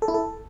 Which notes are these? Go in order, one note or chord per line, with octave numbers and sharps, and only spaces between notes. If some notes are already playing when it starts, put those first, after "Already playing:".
A4
E4
A4